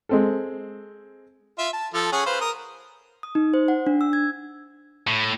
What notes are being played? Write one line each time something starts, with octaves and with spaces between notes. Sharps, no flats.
G#3 C4 A4
F4 E5
A5
F3 A4
C#4 G#4 F#5
B4 C5 F5
A#4 D#6
D#6
D#4
C5
F#5
D4
E6
G#6
A2